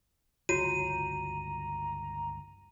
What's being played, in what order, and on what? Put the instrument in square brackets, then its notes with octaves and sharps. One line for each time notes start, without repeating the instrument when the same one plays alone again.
[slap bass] G1 C#2 F#3 [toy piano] F4 F#4 C#5 [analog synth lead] A#5 [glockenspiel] D#7